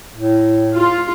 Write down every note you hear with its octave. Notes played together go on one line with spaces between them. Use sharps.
A2
F4